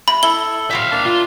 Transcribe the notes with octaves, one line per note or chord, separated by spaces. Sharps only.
C3 B5
E4 A4 G7
C4 F#4 G4 E5 F5
A#3 D4 A5
F4